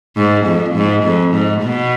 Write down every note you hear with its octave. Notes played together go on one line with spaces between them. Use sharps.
G#2
F2
G#2
F2
G#2
B2